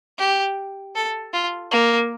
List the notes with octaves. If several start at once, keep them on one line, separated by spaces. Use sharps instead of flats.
G4
A4
F4
A#3